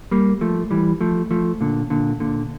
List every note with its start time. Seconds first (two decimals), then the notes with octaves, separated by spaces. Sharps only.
0.11 G3 A#3
0.41 F3 A3
0.71 E3 G3
1.01 F3 A3
1.31 F3 A3
1.61 A#2 D3
1.90 A#2 D3
2.20 A#2 D3